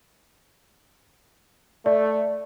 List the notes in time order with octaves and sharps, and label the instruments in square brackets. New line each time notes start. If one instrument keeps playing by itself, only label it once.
[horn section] A3 [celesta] D5